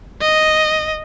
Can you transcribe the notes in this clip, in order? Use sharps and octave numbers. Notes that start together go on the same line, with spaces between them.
D#5